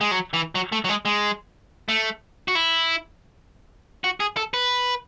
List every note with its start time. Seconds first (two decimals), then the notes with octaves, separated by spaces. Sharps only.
0.01 G#3
0.11 F#3
0.33 E3
0.55 F#3
0.72 A3
0.84 F#3
0.89 G#3
1.05 G#3
1.89 A3
2.48 F#4
2.55 E4
4.04 F#4
4.20 G#4
4.37 A4
4.54 B4